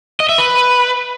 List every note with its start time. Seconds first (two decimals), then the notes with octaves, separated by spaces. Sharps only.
0.20 D#5
0.29 E5
0.38 B4